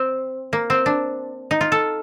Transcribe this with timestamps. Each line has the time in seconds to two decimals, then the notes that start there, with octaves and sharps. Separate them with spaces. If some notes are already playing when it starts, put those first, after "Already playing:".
Already playing: C4
0.53 A#3
0.70 C4
0.86 D4
1.51 D#4
1.61 F4
1.72 A4